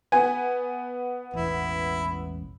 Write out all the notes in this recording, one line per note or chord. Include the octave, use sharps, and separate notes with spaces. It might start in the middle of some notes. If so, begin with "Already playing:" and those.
B3 G#5
E1 A1 E4